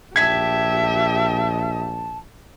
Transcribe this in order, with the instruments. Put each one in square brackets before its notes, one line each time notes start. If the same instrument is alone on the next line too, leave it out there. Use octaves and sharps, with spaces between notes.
[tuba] A#1 [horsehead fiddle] G4 E5 [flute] A5 [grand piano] G#6 B6